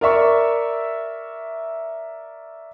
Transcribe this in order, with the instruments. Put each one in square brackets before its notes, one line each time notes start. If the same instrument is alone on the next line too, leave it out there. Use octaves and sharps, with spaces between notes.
[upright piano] A#4 D5 E5 C#6